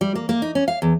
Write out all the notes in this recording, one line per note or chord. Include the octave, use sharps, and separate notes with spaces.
G3
A#3
A#3
D#4
C#4
F5
E2